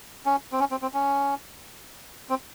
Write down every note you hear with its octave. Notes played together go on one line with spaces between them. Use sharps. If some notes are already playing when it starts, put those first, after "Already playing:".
C#4
C4
C#4
C4
C4
C#4
C4